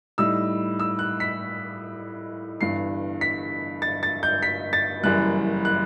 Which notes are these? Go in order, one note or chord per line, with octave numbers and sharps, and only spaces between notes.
A2 G3 D#4 E6
E6
F#6
B6
G1 G2 E3 C7
B6
A6
A6
G6
B6
A6
F#1 F#2 E3 G3 F#6
F#6